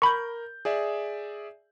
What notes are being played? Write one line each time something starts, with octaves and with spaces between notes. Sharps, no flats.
A#4 B5 C#6 G6
G#4 D5 E5